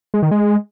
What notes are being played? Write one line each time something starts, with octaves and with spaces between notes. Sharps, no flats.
G#3
D#3
G#3